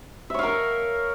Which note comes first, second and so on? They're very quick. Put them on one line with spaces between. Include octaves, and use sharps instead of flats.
E5 C#5 F5 A#4